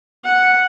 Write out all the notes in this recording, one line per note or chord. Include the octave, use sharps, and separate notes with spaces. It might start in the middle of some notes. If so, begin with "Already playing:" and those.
F#5